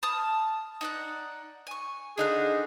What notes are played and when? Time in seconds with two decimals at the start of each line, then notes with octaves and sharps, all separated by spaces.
0.03 A5 D#6 F6
0.81 D#4 D5 F#5
1.67 G#5 C#6
2.18 D3 D4 D#4 G#4 F5 F#6